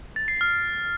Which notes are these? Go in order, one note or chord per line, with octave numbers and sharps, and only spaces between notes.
A6
C7
F6